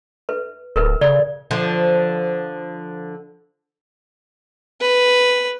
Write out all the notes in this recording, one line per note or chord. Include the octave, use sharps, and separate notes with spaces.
B4
D1 A#4 B4
C#3 D5
D3 F3
B4